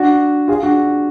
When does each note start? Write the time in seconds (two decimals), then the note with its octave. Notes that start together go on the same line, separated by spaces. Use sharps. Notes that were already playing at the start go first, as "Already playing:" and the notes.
Already playing: D4 F#4
0.48 F4 G#4
0.63 D4 F#4